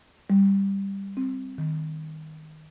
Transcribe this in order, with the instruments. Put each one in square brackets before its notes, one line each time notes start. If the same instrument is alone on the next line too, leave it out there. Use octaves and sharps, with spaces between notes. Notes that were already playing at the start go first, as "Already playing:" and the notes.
[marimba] G3
C4
D#3